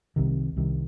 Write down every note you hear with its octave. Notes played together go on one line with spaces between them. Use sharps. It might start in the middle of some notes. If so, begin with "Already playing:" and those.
C2 C3 D#3
C2 C3 D#3